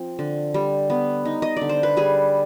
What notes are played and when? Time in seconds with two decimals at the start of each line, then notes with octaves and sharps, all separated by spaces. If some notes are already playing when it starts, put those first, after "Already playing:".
Already playing: F3 C4
0.19 D3
0.54 G3
0.90 B3
1.25 D#4
1.42 D#5
1.57 D3 D5
1.69 C5
1.83 B4
1.97 G3 G#4